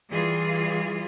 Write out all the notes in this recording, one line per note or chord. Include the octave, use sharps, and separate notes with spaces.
E3 G3 F4 G#4